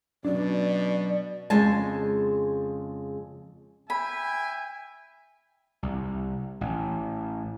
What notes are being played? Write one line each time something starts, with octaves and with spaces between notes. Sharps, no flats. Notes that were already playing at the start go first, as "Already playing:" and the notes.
B2 F#3 C#4 D4 D5
F2 C#3 G#3 G#5 A5
E5 G5 G#5 B5
C2
A1